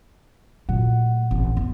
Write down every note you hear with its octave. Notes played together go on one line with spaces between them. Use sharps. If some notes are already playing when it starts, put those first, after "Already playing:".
A#2 F#3 A3 F#5
A1 F2
E2